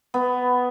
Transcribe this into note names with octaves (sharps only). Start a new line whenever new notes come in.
B3